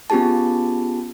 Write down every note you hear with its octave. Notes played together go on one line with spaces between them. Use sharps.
B3 C#4 F4 G4 G#4 A5